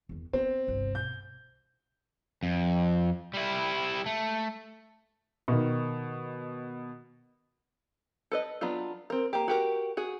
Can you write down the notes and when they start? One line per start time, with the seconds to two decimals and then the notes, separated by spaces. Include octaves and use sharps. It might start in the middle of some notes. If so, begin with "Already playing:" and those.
0.09 E2 D#3
0.33 B3 C4
0.67 G1 C2
0.95 B2 G6
2.43 F2
3.34 G3 E4
4.06 A3
5.48 B2 D#3
8.32 A4 B4 D#5
8.61 F#3 B3 D4 F4
9.10 C4 A#4
9.33 A#3 G4
9.48 F#4 G4 A#4
9.97 F#4 G#4